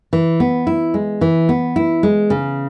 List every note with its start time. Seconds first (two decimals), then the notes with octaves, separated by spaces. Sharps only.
0.13 E3
0.40 B3
0.67 E4
0.94 G#3
1.21 E3
1.49 B3
1.76 E4
2.03 G#3
2.30 C#3